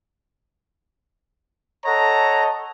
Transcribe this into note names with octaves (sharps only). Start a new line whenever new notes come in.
A4 C#5 D#5 F#5 A5 A#5